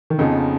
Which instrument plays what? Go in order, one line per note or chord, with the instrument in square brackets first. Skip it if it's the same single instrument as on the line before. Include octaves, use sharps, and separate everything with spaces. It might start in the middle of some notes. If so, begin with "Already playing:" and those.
[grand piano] D#3
[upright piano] F2 F3 B3 D#4 G#4 [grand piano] C#3